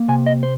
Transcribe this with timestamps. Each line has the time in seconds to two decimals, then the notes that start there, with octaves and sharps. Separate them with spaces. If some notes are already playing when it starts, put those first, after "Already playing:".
Already playing: A#3
0.08 C3 G#5
0.26 D#5
0.43 C5